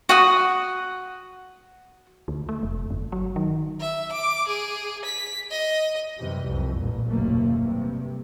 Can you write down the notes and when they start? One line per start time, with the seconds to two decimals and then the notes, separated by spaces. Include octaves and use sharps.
0.09 F#4 F#5 D#6
2.28 D2
2.49 A3
2.63 F1
2.90 G1
3.12 F#3
3.36 D#3
3.80 E5
4.12 D6
4.48 G#4
5.05 B6
5.51 D#5
6.18 F#2 C3 E3 G3
6.48 C2 F2
6.78 A1 A#2
7.09 F#1 D#2 B2 A3 A#3
7.59 G2 C3